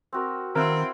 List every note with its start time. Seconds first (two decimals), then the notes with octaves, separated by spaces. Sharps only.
0.13 C4 F#4 A#4
0.56 D#3 C4 E4 A#4 F5 F#5